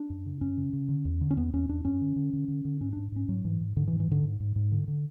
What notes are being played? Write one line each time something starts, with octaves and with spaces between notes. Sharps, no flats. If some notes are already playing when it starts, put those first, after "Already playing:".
Already playing: D4
F#2
C#3
F#2 C#4
C#3
C#3
D3
E2
D3
C#4
E2 B3
E2 C#4
E2 D4
F#2 C#4
D3
D3
D3
D3
D3
G#2 C#4
G#2 D4
G#2 C#4
G#2 F#3
G#2 E3
G#2
G#2 D3
E3
G#2
E3
G#2 D3
G#2
G#2
G#2
D3
D3